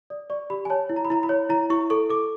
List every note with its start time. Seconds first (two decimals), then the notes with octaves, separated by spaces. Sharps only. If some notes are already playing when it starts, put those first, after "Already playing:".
0.10 D5 D#6
0.30 D5 C#6
0.50 G4 B5
0.65 G#5
0.70 C#5 A5
0.90 E4
0.96 A#5
1.05 B5
1.10 E4 A#5
1.23 B5
1.29 C#5
1.49 E4 A#5
1.70 E4 C#6
1.90 A4 C#6
2.10 A4 D6